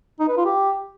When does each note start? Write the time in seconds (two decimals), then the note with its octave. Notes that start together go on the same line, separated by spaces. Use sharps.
0.20 D#4
0.28 B4
0.37 F4
0.45 G4